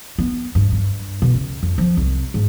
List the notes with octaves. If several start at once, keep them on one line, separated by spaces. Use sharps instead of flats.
B3
G2
G2
B2
C#2
F2
F3
C2
G#2